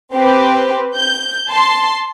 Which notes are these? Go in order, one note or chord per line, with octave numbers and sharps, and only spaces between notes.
C4 G4 B4
G6
A5 C6